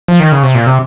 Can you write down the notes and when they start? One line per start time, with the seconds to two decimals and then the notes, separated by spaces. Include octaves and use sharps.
0.08 F3
0.20 D#3
0.32 C#3
0.43 C3
0.55 A#2
0.66 C3